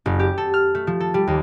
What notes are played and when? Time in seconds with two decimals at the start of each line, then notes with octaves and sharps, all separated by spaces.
0.06 F#1
0.19 G4
0.38 A4
0.54 F6
0.75 A3
0.87 F3
1.00 A4
1.14 G3
1.27 D#2